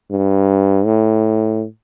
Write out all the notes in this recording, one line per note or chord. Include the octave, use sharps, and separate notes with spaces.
G2
A2